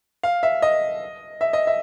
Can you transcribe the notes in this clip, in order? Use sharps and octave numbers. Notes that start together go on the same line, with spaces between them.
F5
E5
D#5
E5
D#5
E5